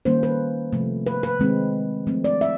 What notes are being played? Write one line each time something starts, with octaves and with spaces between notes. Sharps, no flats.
D#3 G3 A#3 C#4 C5
B4
C3 F3 A3
B4
B4
D#3 G#3 C4
F3 A3 C4
D5
E5